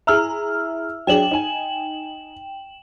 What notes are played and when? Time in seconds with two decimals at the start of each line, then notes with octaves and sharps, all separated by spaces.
0.07 E4 G#4 E5 A#5 E6 F6
1.07 F#3 D4 G#4 G5 E7 F#7
1.31 D#4 G#5